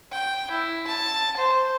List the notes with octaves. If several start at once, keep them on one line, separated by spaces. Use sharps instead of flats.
G5
E4
A5
C5